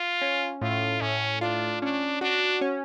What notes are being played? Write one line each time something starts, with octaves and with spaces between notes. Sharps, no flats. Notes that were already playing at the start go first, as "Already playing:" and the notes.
Already playing: F4
C#4
A2 F4
A2 C#4
D4 F4
C#4 D4
D4 F#4
C#4